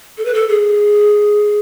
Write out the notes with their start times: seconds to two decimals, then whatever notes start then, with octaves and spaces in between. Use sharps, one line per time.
0.18 A4
0.25 B4
0.34 A4
0.49 G#4